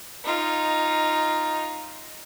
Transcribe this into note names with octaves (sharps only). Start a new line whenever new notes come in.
D#4 F4